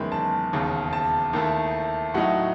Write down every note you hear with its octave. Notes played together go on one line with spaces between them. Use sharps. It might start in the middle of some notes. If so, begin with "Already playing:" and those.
Already playing: F#1 E2 D#3 G#3 C#4 B5
A5
E1 D#2 C#3
A5
D#2 D#3 A3 E4
A2 F#3 A3 D#4 F#5